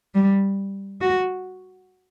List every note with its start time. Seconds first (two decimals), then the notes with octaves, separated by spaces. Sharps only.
0.15 G3
1.01 F#4